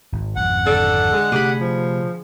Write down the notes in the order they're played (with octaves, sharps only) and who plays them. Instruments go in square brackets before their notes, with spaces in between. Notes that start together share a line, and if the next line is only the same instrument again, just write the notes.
[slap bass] G#1
[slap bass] G#1 F2 [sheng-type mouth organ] F#5
[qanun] D3 D4 [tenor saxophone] A4
[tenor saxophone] G#3
[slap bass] C3 A3 [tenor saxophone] G4 [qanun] G#4 B5
[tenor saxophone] F3